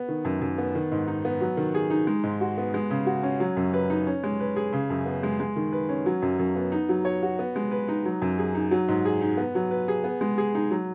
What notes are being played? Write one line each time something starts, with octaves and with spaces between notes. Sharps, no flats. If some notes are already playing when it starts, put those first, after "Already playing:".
Already playing: B3
D#3
F#2
F#2
B3
D#3
G#2
D#4
B3
F#3
D#3
G#4
D#4
G#3
G#2
F#4
B3
G#3
C#3
F#4
C#4
F#3
F#2
B4
D#4
C#4
G#3
B4
G#4
C#3
F#2
B3
G#3
G#3
D#3
B4
C#4
F#3
F#2
F#2
B3
D#4
F#3
C#5
F#4
B3
G#3
B4
D#4
F#3
F#2
G#4
D#4
F#3
G#2
G#4
D#4
B3
F#3
B4
G#4
B3
G#3
G#4
D#4
F#3